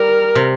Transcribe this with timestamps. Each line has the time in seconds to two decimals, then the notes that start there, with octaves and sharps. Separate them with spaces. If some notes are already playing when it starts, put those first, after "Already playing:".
Already playing: G3 A#4
0.35 C3